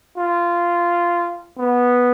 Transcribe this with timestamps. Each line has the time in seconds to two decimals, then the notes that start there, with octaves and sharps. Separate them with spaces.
0.17 F4
1.58 B3